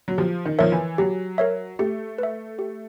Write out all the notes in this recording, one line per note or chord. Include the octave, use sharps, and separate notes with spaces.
F#3
F3 G4
D#3
F3 A#4 C#5 E5
E3
F#3 G4
A#4 C#5 E5
A3 G4
B4 E5
G4